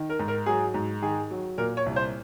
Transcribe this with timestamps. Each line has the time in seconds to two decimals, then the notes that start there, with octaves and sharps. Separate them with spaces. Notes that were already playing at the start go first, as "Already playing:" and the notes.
Already playing: D#3
0.10 A#4
0.19 G#2
0.28 A#4
0.46 F#3 G#4
0.74 G#2
1.02 D#3 G#4
1.31 F#3
1.58 A#2 A#4
1.77 C#5
1.86 C2
1.96 C5